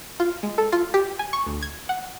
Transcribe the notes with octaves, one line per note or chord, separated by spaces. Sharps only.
F4
G#3
A4
F4
G4
G#5
C#6
D2
G#6
F#5